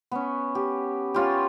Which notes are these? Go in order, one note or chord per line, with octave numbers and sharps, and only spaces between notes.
B3 C#4
G4
C#4 F4 G4